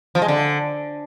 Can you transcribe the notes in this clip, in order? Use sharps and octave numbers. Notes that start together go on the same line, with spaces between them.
F3
G#3
D3